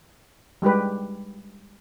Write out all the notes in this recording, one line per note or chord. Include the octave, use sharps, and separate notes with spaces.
G3 G#3 G4 B4